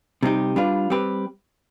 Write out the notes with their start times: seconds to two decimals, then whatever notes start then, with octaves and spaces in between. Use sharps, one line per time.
0.23 C3 G3 C4 D#4 G4
0.56 G3 D4 F4 B4
0.90 G3 C4 G4 B4